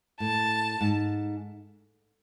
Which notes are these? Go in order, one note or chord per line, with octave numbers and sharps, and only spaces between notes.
A2 A5
G#2